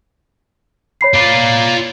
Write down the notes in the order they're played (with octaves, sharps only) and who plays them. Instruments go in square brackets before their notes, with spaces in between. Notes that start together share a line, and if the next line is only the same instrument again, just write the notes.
[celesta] C#5 B5 C7
[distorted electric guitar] F4 D5